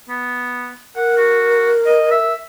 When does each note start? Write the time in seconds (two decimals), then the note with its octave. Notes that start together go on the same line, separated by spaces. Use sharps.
0.09 B3
0.96 A#4 F#5
1.17 F#4
1.86 D#5
2.11 E5